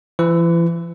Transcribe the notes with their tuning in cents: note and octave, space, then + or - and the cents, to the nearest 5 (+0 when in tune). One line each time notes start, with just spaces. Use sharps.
E3 +40 E4 +35 B4 +40